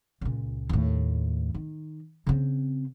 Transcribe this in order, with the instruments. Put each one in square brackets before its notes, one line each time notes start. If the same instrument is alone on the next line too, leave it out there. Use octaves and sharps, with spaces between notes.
[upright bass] C#2 A#2
D#2 A2
D#3
C#3 C4